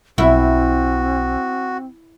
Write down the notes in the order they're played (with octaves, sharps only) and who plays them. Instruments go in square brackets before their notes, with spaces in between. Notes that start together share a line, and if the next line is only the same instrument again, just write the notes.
[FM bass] B1 [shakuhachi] C4 [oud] E4 [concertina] F#4